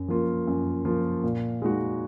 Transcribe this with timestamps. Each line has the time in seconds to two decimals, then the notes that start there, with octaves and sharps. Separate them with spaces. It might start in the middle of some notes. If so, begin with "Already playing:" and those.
Already playing: F#2
0.08 F3 A#3 F4
0.47 F#2
0.85 F3 A#3 F4
1.24 A#2
1.62 G#3 D#4 F#4